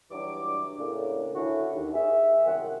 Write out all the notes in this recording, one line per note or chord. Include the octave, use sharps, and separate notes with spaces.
C#2 E3 F#3 G3 D4 D6
A2 C#3 A#3 D4
D3 C#4 E4 F#4
D#2
D#3 G#4 E5
C2 F#2 C4 F#4 C#5 F#5